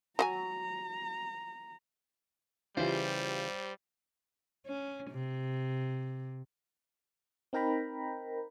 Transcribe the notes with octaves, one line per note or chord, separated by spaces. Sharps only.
F#3 F#5 G#5 A#5
C#3 E3 G3 F4 G4 C5
C#4
C3
C4 D#4 A#4 G5 A#5 B5